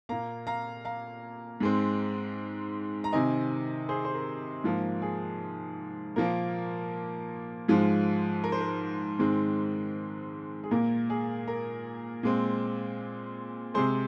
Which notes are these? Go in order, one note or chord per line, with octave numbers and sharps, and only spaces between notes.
A#2 A#3 F5 A#5
F5 A#5
F5 A#5
G#2 G#3 C4
A#5
C3 D#3 C4 D#5 G#5
G#4 C5
C5
A#4
G#2 F3 A#3
G#4
A#2 F3 A#3 A#4
G#2 F3 G#3
A#4
C5
A#4
G#2 D#3 G#3 C4
G#4
A#2 A#3 A#4
G#4
A#4
A#2 G#3 C4
C3 G#3 C4 G#4 C5